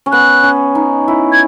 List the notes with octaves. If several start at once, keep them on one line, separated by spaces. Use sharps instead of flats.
C#4
B3 F#6
C#4
D#4
E4
G#6